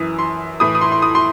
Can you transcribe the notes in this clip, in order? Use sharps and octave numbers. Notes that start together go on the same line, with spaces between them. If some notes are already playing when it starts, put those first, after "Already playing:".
Already playing: F#2 E3 D#6
C6
A2 E3 D#6
D#6
C6
C6
D#6
C6